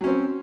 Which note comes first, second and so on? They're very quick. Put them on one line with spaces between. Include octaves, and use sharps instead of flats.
F#3 C#4 C4